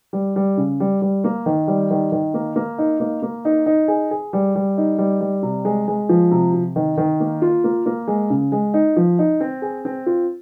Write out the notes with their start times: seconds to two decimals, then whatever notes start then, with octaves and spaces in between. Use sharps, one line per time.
0.13 G3
0.36 G3
0.57 C#3
0.80 G3
1.02 G3
1.24 A#3
1.46 D#3
1.68 G3
1.91 D#3
2.12 D#3
2.34 A#3
2.56 A#3
2.78 D#4
3.00 A#3
3.22 A#3
3.45 D#4
3.66 D#4
3.88 G#4
4.11 G#4
4.33 G3
4.56 G3
4.78 D#4
4.99 G3
5.21 G3
5.43 C3
5.65 G#3
5.88 G#3
6.09 F3
6.31 C3
6.53 C3
6.76 D#3
6.97 D#3
7.20 A#3
7.42 F4
7.64 A#3
7.86 A#3
8.07 G#3
8.30 C#3
8.52 G#3
8.74 D#4
8.97 F3
9.19 D#4
9.41 C4
9.62 G#4
9.85 C4
10.06 F4